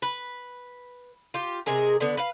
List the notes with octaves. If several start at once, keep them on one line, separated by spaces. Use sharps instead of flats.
B4
F4 G4
C3 G#3 G#4 A#4
D3 B3 D4
B4 F5